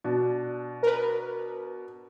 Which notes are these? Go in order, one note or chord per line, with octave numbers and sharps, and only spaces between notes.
B2 D4
A#4 B4